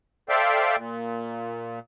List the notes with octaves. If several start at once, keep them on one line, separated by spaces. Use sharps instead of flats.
A4 C5 D5 E5 F5 G5
A#2